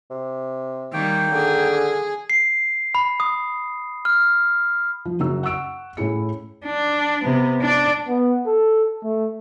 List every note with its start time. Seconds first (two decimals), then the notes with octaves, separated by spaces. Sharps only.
0.10 C3
0.93 D#3 G3 A#3 G5
1.32 D3 G#4
2.30 C7
2.95 B5
3.20 D#6
4.05 F6
5.05 F3
5.20 F#1 F#2 C#3 F#4 E6
5.43 F#5 C#6 E6 D7
5.97 A2 C#4 E4 G#4 C#7
6.66 D4
7.24 C3 B3
7.61 D4 D5
8.08 B3
8.46 A4
9.04 A3